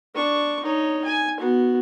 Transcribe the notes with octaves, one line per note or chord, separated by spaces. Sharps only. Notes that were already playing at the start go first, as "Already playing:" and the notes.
D4 C#6
D#4 C#5
G#5
B3 F#4